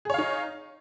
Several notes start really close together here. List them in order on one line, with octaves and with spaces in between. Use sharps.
G#4 C#5 F5 D#4